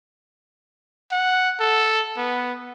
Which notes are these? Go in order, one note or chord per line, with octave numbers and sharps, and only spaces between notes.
F#5
A4
B3